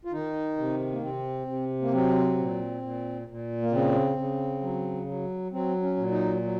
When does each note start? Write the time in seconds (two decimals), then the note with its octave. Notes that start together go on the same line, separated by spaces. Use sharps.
0.05 F4
0.12 D#3 D#4
0.58 C3
0.92 A#3
1.02 C3 C4
1.47 C3
1.82 A#3
1.92 F#3 C4
2.38 A#2
2.82 A#2
3.28 A#2
3.62 A#3
3.72 C#3 C4
4.17 C#3
4.62 F#3
5.07 F#3
5.52 F#3 C4
5.82 C#4
5.97 A#2
6.11 D#4
6.42 F#3